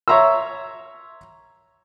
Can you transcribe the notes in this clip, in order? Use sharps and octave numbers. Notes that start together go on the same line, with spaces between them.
C#5 E5 A#5 C6 E6